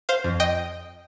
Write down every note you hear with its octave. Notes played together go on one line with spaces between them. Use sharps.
C5 F5
F2
D#5 G5